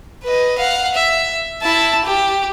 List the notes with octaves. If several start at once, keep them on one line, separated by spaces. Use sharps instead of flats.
B4 D#5
F5 F#5
E5
E4 A5
G4